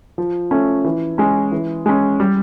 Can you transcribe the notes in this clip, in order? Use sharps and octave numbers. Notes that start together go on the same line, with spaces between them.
F3
A3 C#4
E3
G#3 C#4
E3
G#3 C#4
G3